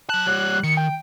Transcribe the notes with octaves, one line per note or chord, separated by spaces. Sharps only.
F#3 A5 F#6
G3 C#5
D#3 C#7
G5